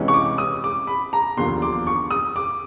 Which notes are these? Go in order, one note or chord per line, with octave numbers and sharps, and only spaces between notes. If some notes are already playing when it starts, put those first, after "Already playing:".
Already playing: C#2 C3 E3 G#3 C#4
C#6
D6
D#6
D6
B5
A#5
E1 D#2 D3 F3 C6
D6
C#6
D#6
D6